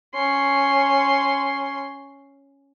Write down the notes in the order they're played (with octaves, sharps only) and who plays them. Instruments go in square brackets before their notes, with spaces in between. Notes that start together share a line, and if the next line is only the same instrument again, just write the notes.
[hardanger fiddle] C#4 C6